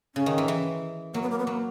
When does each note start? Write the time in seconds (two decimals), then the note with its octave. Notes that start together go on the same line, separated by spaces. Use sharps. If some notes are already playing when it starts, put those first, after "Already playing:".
0.15 C#3 C#4
0.26 D#3
0.38 E3
0.48 E3
1.14 F#3 A#3
1.22 B3
1.31 A#3
1.39 B3
1.47 F#3 A#3